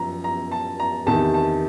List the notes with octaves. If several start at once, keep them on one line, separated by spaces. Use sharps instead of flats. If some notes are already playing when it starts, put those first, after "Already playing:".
Already playing: F#2 F3 A#5
A#5
A5
A#5
E2 C3 D#3 A5
A5